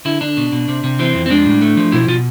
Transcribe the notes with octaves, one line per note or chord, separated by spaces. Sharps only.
D3 E4
D3 D4
B2
B2
C3
C3
E3 C4
F2
C4
G#3 D4
A2
A3
F3
B2 E4
B2 F4